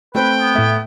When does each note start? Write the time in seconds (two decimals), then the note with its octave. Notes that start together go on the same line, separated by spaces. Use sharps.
0.15 A3 C4 B4 C5 G5
0.39 B3
0.55 A2 A3 E5